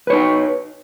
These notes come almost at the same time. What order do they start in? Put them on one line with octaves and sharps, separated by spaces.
B4 C#5 D#4